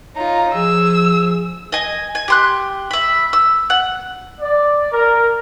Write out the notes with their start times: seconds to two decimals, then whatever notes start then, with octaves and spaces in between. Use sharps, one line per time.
0.16 D#4 F4 C#5 A#5
0.54 F3 G#4 E6
1.72 D#5 G#5
2.15 G#5
2.28 G4 C6 F#6
2.91 E5 B5
3.33 E6
3.70 F#5
4.40 D5
4.92 A#4